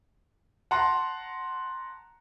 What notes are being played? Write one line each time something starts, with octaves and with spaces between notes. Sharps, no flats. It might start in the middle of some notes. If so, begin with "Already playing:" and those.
F#5 A5 A#5 C6